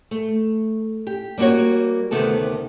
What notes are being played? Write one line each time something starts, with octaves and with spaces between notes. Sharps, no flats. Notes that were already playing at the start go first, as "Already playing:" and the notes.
A3
G4
G3 A#3 B3 F#4 C#5
D2 C3 D#3 B3 A4